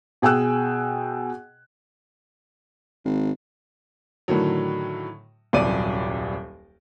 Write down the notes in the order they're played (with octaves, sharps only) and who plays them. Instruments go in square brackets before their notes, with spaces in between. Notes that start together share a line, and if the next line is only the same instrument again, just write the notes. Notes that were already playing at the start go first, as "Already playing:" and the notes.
[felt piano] B2 G#4 G5 G#5 E6 F#6
[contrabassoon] G#1
[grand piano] A2 D3 D#3 F#3
D#1 C2 F#2 D5 D6 D#7